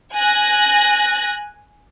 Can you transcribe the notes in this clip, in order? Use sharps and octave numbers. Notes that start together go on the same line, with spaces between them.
G#5 F#6 A#6